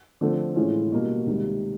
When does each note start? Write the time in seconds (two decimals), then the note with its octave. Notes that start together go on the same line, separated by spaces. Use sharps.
0.21 D3 F3 A3 C4
0.56 A2 E3 G#3 C#4 F4
0.92 B2 G3 A#3
1.27 C#2 C3 D#3 G3